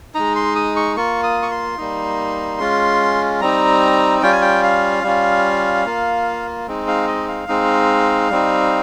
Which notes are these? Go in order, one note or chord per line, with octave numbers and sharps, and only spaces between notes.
G#3 D#4 A#5
C6
D#6
C#6
A#3 F4 C#6
D#6
C#6
C6
G3 A#3 D#4
G#3 C#4 F4
G3 C4 D#4 A#5
G3 C#4 F4 G5
G#5
G5
F5
G3 C#4 F4
A#3 F4
G#3 C4 D#4
F5
D#5
F5
G#3 C4 D#4
G3 C4 D#4